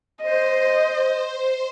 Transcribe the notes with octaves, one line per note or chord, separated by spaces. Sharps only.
C5 D#5